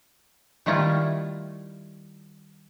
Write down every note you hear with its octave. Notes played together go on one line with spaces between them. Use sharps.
D#3 G3 A3 E4 F4